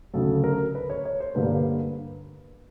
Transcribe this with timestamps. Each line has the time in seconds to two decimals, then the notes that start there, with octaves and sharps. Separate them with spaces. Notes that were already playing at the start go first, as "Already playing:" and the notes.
0.13 D2 C#3 F#3 A4
0.44 A#4
0.75 B4
0.90 C#5
1.05 C#5
1.20 C5
1.35 G2 D3 G3 A#3 B4